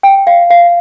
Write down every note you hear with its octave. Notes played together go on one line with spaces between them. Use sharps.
G5
F5
F5